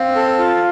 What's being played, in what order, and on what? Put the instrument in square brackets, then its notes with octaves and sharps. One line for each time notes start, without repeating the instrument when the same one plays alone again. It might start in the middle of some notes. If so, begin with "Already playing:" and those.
Already playing: [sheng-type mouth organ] C4 [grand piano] F5
[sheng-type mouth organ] A4
F4